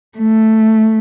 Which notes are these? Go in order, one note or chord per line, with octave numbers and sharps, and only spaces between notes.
A3